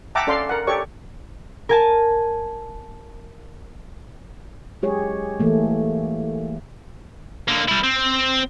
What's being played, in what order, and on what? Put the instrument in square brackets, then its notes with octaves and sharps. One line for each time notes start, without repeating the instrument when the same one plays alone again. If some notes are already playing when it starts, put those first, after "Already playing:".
[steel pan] E5 F#5 G5 A5 A#5 D6
C#4 A4 D5 F5 C6
A#4 F#5
G4 A4 C#5 D5 C#6
[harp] A#4 G#5 A5
[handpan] F#3 G#3 G4 G#4 C#5
E3 A3 A#3
[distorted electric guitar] D3 A#3
G3 E4
C4